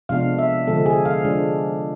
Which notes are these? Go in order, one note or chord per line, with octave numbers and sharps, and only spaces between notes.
C3 F3 G#3 B3 D4 F5
E5
D3 F3 G#3 C4 A4
G#4
F5
F3 G#3 D4